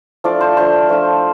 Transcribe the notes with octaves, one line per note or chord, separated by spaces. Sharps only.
F3 A3 D4 F4 D5
C5
F3 A3 D4 F4 C5
F3 A3 D4 F4